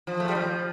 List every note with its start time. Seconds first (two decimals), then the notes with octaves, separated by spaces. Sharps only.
0.07 F3
0.20 A3
0.28 G3
0.35 F3